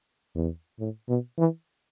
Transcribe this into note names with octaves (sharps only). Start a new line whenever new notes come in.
E2
A2
B2
E3